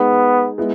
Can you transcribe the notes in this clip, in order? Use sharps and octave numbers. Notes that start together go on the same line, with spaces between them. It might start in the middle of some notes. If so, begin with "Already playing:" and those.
Already playing: G#3 B3 D#4 G#4
G#3 B3 E4